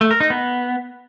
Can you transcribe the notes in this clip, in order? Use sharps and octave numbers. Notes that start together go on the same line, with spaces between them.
A3
A#4
D#4
B3